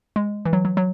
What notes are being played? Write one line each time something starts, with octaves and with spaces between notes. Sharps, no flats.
G#3
E3
F#3
F#3
F#3